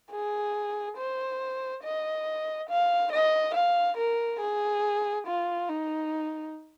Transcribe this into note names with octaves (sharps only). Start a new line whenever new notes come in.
G#4
C5
D#5
F5
D#5
F5
A#4
G#4
F4
D#4